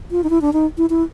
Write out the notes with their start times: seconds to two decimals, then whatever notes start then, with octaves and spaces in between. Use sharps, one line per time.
0.11 F4
0.24 D#4
0.30 E4
0.41 D4
0.53 D#4
0.78 E4
0.90 E4